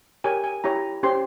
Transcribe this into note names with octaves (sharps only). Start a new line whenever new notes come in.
G4 A#4 C#5 G#5
G#5
E4 G4 C#5 A#5
C#4 G4 C5 C6